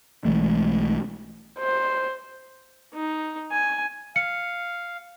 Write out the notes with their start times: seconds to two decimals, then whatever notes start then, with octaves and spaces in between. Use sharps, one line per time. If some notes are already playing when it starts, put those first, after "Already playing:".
0.25 B1 E3 G#3 A3
1.59 C5
2.94 D#4
3.51 G#5
4.16 F5 C#7